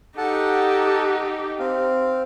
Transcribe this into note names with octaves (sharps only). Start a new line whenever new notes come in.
D#4 G4 A4 F#5 A5
C4 F5